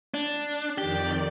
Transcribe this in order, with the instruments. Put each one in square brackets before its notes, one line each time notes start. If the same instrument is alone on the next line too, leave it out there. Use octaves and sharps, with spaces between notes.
[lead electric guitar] D4
[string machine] F2 D#3 D5 [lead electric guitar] G4